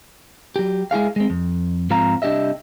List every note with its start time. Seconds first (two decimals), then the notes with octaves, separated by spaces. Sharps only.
0.56 F#3 G4
0.91 G#3 E4 G#4 F5
1.16 G#3 C4
1.30 F2
1.90 G#2 F3 C4 F5 A#5
2.22 C2 D4 G4 D#5 E5